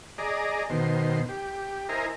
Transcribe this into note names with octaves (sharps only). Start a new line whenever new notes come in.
G#4 D5 D#5 A#5
B2 D#3 C5
G4
E4 A#4 C5 D#5 G#5 A#5